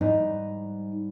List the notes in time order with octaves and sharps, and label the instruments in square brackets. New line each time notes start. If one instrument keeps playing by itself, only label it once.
[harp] G#2 G3 [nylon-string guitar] D#4